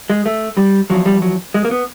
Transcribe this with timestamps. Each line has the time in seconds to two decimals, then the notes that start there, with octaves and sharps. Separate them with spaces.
0.10 G#3
0.26 A3
0.57 G3
0.90 E2 C3 F3 F#3
1.06 G3
1.22 F#3
1.54 G#3
1.65 A#3
1.71 B3